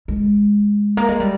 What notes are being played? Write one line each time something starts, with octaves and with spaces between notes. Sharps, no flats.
G#3
A#3
G#3
G3